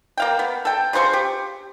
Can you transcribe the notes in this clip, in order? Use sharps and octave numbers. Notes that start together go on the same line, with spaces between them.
A#3 F5 G5
B3
A4 G5
C#3 F4 C5 C#6
G4